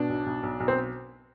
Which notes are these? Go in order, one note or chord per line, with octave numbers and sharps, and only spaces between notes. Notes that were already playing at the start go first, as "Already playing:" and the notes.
Already playing: B2 D4
B1
B1
B1
B1
C4